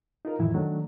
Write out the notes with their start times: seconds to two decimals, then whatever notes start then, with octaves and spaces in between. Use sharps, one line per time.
0.25 D#4 F4 A#4
0.39 F2 A2 D#3 E3 F#3 E4
0.54 D#3 F#3 A3 D4